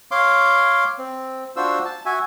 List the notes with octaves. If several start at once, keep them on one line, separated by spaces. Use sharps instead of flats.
C#5 F5 C6 D6
C4
D4 F4 F#4 C5 E6
A5
F#4 E5 G#5